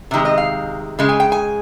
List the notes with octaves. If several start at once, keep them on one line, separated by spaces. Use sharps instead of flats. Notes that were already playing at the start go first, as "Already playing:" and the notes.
C3 D#3 G#3
D#5
F5
C#3 G#3
G#5
G5
G#5